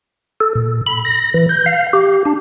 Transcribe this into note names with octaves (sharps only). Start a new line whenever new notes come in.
A4
A#2
B5
A#6
E3
G6
F5
G4
D4